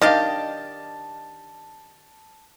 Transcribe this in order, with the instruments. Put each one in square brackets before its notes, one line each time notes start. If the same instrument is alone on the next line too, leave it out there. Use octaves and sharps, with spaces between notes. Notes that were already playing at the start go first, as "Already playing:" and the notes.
[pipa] D#3 D4 G4 [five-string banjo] D#5 F5 [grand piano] A5 A6